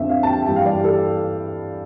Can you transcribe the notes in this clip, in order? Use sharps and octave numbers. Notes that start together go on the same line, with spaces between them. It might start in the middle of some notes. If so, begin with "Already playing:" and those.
Already playing: F2 D3 F3 E5
F5
A5
G5
G2 E3 G5
F5
D5
G4
A4